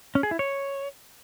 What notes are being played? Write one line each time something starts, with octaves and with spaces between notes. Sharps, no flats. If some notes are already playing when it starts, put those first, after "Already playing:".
C#4
G#4
E4
C#5